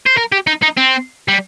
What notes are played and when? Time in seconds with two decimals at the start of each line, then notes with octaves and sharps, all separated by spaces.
0.06 C5
0.18 A#4
0.32 G4
0.47 D#4
0.62 D#4
0.77 C4
1.28 G3